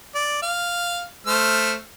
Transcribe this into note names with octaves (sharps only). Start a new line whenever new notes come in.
D5
F5
A3 C5 F6